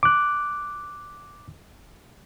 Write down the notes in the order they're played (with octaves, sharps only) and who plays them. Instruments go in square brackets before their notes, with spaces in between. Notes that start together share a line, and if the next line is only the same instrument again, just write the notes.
[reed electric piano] D6 F#6